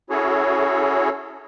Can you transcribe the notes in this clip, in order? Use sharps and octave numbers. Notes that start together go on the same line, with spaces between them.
C#4 E4 F#4 G#4 A4 C#5